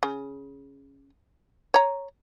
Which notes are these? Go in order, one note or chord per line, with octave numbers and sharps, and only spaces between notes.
C#3
C#5 A#5